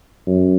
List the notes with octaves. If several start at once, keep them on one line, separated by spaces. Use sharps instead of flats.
F#2